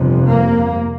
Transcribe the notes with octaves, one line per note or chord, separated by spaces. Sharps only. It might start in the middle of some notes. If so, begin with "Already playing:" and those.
Already playing: G1 F2 C3
A#3